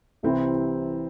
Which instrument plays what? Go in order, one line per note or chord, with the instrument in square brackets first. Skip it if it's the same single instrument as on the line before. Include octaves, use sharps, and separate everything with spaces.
[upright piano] C2 C3 E3 C4 E4